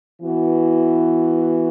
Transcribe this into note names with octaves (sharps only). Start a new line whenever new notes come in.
E3 B3 F#4